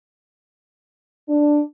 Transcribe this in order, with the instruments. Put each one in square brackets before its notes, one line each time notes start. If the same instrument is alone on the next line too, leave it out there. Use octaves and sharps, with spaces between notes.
[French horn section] D4